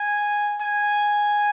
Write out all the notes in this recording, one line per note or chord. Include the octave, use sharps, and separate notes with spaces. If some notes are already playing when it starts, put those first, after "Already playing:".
Already playing: G#5
G#5